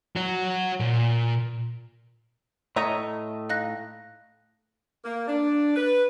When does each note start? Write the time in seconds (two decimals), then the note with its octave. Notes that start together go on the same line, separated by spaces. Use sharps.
0.17 F#4 C#5
0.80 A#2
2.76 A2 A3 C#5 D#5 E5 A#5
3.50 D#4 F5 F#6 A#6
5.04 A#3
5.27 D4
5.75 B4